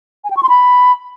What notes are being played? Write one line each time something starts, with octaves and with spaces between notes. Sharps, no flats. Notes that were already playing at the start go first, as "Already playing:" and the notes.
G#5
G5
C#6
C6
B5